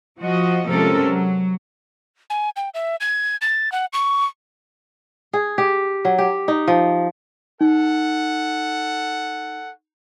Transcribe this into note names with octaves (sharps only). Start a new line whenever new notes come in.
F3 F#4 D#5
C3 F3 G#3 C#4 A4 A#4
F#3
G#5
G5
E5
G#6
A6
F#5
C#6
G#4
G4
F#3
G4
D#4
F3
D#4 A4 F#5